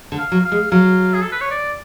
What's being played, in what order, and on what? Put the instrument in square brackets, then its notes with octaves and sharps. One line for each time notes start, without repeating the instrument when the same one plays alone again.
[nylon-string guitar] D3
[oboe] F5
[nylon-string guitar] F#3
[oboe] F5
[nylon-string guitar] G#3
[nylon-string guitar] F#3 [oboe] F5
[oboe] G#4
A4
B4
C#5
D5